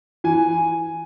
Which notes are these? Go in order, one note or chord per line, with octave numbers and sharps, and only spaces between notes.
E3 G#5